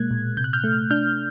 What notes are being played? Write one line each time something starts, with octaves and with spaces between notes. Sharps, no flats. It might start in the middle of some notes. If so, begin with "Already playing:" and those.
Already playing: B2 G#3 A#3 F#6 G#6
A#2
C3 G6
F#6
F6 G6
A3
D4 F6 G6